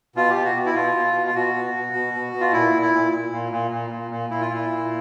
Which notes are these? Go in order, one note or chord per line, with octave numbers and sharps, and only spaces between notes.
B2 F4
G4
B2
F#4
B2
E4
B2 F4
B2
B2
F4
B2 F#4
B2
B2
B2
B2
B2
F4
A#2 E4
A#2
E4
A#2
A#2
A#2
A#2
A#2
A#2
A#2
A#2 E4
F4
A#2 E4
A#2